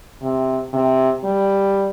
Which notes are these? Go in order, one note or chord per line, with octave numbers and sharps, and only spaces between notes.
C3
C3
G3